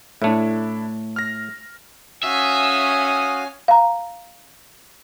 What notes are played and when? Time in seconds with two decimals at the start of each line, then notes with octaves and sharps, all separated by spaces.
0.22 A2 A3 D4 E4
1.16 F6 A#6
2.24 C#4 F#4 E5 F5 G#5 D#6
3.68 F5 A#5